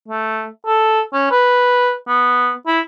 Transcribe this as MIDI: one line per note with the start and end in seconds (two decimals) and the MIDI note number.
0.08 0.48 57
0.67 1.01 69
1.13 1.30 61
1.31 1.94 71
2.08 2.53 59
2.67 2.80 64